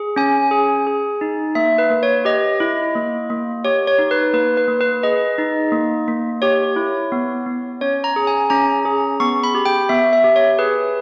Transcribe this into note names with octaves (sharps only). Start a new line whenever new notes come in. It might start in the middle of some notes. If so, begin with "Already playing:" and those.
Already playing: G#4
C#4 G#5
G#4
G#4
D#4
A#3 E5
B4
A#3
C#5
G4 D#5
E4
A#3
A#3
G4 C#5
C#5
D#4
B4
A#3 B4
B4
A#3
B4
G#4 D#5
D#4
A#3
A#3
G4 C#5
E4
B3
B3
C#4 C#5
A#5
G#4
G#5
C#4 A#5
G#4
B3 C#6
B5
G4
G5
B3 E5
E5
G4
C#5
G#4 B4